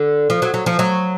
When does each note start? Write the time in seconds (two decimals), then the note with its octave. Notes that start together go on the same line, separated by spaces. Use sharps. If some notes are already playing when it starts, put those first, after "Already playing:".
Already playing: D3
0.30 F3
0.42 F#3
0.54 F#3
0.66 F3
0.79 F#3